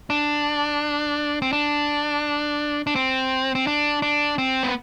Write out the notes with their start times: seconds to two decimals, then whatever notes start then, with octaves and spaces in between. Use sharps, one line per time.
0.10 D4
1.42 C4
1.53 D4
2.87 D4
2.95 C4
3.55 C4
3.67 D4
4.02 D4
4.38 C4
4.63 B3